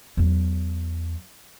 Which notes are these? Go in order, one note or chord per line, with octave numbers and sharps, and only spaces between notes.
E2 F#3